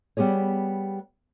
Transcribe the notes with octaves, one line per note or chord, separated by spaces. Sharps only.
G3 B3 G4 G#4 C#5